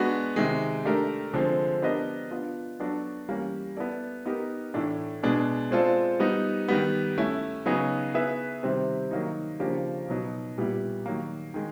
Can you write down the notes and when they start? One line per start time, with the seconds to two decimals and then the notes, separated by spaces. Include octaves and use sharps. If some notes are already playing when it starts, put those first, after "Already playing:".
Already playing: G#3 B3 D4 F#4
0.36 C3 D#3 G#3
0.85 A3 D4 G4 A#4
1.34 D3 F3 G#3 C4
1.82 B3 D4 G4 A#4 D#5
2.31 B3 D4 F4
2.80 F#3 B3 D4 F#4 A4
3.29 E3 G3 A#3 C#4
3.77 B3 E4 A4 D5
4.25 B3 D#4 G4 A#4
4.74 A2 E3 A3 D4
5.23 B2 G#3 B3 D4
5.71 G#3 C4 F4 A4 D5
6.20 G3 B3 D#4
6.68 D#3 G3 B3
7.18 A3 C#4 E4
7.66 C#3 F#3 B3 D#4 G#4
8.14 B3 E4 G#4 B4 E5
8.63 C3 D#3 G3 C4
9.11 D#3 F#3 A#3 D#4
9.59 C#3 F3 A#3 D4 G4
10.08 B2 F#3 B3 D#4
10.58 A#2 G3 B3 E4 G4
11.06 D#3 F#3 A#3
11.54 D#3 G#3